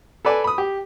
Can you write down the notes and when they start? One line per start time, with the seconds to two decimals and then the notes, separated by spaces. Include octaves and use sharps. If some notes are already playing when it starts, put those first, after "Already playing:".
0.25 A4 B4 D5 G#5
0.44 B5 D#6
0.58 G4